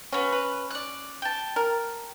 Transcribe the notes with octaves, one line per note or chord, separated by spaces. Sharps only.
B3 C#4 F#4
B4
D5 F#6
G5 A5
A#4